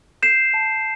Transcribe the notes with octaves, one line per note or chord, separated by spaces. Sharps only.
G6 C7 E7
A5